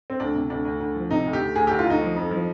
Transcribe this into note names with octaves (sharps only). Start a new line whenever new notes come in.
C4
D2 D4
C3
D2 D4
D2
D2
F3
C3 D#4
D2
G4
D2
D2 G#4
D2 G4
F4
D2 D#4
F3
F2
F3